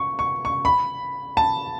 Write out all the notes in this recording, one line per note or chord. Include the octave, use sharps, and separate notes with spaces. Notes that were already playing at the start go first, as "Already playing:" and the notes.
Already playing: C#6
C#6
C#6
B5
A5